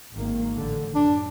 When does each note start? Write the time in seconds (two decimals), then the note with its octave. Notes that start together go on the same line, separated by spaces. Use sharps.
0.14 G#1 D#3 A#3
0.55 A1 D3
0.95 F#2 D4